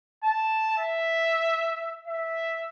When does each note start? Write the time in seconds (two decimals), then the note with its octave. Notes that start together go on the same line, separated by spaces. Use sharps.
0.23 A5
0.78 E5
2.07 E5